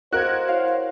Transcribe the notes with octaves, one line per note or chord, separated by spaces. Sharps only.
F#4 A#4 C5 D#5 F5 F#6 G#6
E4 C#5 F5 F#5